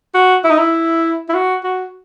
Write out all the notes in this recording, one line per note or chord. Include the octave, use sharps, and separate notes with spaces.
F#4
E4
D#4
E4
E4
F#4
F#4